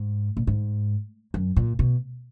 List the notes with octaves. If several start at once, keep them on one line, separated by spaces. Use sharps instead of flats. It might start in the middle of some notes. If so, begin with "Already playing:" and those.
Already playing: G#2
A#2
G#2
F#2
A#2
B2